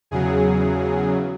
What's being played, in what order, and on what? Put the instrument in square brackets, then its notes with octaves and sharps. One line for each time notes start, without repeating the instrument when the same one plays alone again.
[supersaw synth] E2 C#3 F#3 G#4